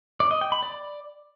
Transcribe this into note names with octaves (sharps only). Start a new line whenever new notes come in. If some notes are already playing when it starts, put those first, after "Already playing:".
D5
D#5
G5
B5
D5